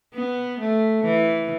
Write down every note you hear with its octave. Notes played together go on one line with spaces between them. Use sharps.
B3
A3
E3